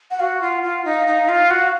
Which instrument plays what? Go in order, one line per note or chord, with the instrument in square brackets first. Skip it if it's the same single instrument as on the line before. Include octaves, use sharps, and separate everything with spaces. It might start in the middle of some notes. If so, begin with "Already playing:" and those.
[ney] F#5
[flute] F#4 [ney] F5
[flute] F4 [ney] F#5
[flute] F4 [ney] F#5
[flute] D#4 [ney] F5
[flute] D#4
F4
F#4